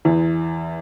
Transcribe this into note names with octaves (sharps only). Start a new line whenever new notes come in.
E2 E3